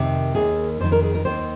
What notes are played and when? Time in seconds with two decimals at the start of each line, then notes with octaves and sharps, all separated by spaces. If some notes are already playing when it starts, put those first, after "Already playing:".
Already playing: F2 C3 D#3
0.35 D#2 D#3 G#4
0.80 F2 C5
0.84 D#3
0.92 A#4
1.02 G#4
1.15 A#4
1.25 D#2 D#3 C5